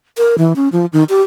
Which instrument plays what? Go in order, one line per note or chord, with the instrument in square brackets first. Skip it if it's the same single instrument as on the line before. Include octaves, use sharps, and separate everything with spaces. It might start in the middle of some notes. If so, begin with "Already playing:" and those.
[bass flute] A#4
E3
C#4
F3
D#3
G4